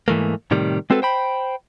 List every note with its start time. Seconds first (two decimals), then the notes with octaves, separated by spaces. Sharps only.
0.08 G#2 E3 A3 A#3
0.51 A2 C3 D#3 G3
0.90 G#3 C4 F#4 A4 B4
1.02 C5 G5 B5